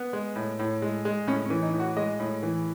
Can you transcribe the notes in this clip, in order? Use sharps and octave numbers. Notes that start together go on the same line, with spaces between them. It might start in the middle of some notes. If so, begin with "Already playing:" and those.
Already playing: B3
G#3
A2
A2
G#3
G#3
A2 C#4
C#4
E3
D#4
A2
F#4
G#3 D#5
A2
E3